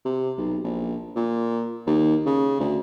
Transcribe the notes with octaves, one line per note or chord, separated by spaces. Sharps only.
C3
B1
A#1
A#2
D#2
C#3
D2